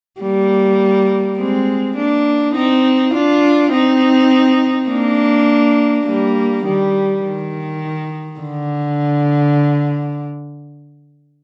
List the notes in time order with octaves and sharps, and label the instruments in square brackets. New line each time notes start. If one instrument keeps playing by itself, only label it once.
[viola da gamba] G3 A#3
G#3 C4
A#3 D4
C4 D#4
D4 F4
C4 D#4
A#3 D4
G3 A#3
D#3 G3
D#3
D3